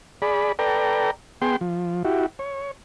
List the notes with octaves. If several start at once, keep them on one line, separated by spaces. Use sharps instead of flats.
G#4 D5 B5
A4 B4 D5 G5 A#5
B3 G#4 G5 C6
F3
E4 F#4 G4
C#5